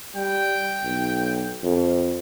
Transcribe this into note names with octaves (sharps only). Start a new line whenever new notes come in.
G3 G5
B1
F2